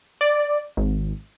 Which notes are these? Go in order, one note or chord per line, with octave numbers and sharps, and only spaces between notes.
D5
G#1